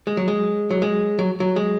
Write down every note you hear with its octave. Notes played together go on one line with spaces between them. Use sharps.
G#3
F#3
G#3
F#3
G#3
F#3
F#3
G#3